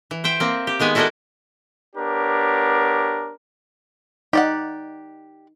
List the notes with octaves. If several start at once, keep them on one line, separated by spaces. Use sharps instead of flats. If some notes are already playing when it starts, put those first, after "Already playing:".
E3
C5 E5 G5
A#3 C4
G4
D#3 G#3 B3 G#5
E4 F#4 A4 A#4 D5 D#5
B3 D4 G4 A#4 C#5
D#4 G4 D5 F#5